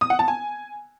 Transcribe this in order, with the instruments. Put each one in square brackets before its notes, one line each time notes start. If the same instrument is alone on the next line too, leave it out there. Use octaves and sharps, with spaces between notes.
[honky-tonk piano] D#6
F#5
A5
G#5